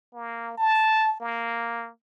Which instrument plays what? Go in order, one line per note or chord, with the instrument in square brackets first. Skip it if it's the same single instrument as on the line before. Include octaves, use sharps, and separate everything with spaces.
[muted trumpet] A#3
A5
A#3